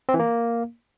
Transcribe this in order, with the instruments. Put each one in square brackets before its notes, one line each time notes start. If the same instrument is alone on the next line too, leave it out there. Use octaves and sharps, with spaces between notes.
[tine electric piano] C4
E3
A#3